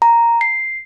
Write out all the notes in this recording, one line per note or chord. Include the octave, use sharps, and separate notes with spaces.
A#5
C7